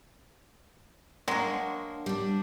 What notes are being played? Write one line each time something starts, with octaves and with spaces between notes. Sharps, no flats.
F#3 G#3 A#3 D4
G3 D4